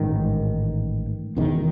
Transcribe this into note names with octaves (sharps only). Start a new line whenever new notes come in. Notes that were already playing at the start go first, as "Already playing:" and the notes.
Already playing: A1 G#2 D#3
E1 E2 D#3